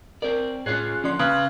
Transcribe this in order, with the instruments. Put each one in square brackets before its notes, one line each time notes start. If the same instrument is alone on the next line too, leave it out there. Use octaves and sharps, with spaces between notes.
[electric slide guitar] C4 D5 [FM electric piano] A#4
[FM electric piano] A2 C#5 [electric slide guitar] C#4 F4 G#4 [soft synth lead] F#6
[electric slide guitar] D3 F3 [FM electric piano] C#4 D5 C6
[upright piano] C#3 [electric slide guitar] B4